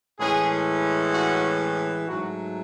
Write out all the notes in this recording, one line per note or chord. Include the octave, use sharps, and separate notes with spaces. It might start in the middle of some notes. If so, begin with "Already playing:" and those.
A2 E3 G#3 C#4 G#4
F#4
G#2 F#3 A3 F#4